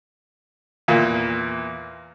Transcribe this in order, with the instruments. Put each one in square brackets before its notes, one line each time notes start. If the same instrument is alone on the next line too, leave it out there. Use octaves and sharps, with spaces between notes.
[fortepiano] E2 A#2 A#3